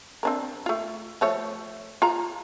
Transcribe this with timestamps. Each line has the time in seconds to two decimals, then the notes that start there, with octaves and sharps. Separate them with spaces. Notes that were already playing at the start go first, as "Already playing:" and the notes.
0.23 C4 D4 A#4
0.66 A3 F4
1.21 F3 A3 C#5
2.02 F4 A#5